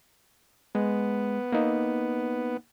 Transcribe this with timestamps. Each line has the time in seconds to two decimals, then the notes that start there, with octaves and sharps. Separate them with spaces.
0.75 G#3 B3
1.52 A#3 D#4